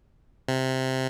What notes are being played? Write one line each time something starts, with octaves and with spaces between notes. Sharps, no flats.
C3